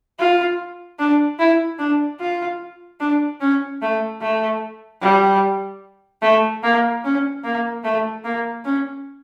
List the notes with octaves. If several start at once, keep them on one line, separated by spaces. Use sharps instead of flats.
F4
D4
E4
D4
F4
D4
C#4
A3
A3
G3
A3
A#3
C#4
A#3
A3
A#3
C#4